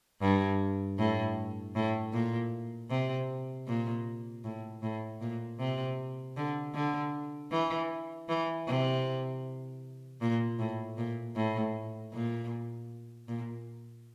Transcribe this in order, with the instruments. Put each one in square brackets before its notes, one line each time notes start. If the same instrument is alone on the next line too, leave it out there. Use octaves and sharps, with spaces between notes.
[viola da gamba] G2
A2
A2
A#2
C3
A#2
A2
A2
A#2
C3
D3
D3
E3
E3
C3
A#2
A2
A#2
A2
A#2
A#2